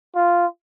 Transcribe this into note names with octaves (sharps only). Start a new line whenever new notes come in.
F4